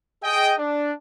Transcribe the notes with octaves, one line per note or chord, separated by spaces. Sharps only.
G#4 D#5 G5
D4